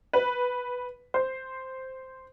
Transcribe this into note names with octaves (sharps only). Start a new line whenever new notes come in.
B4
C5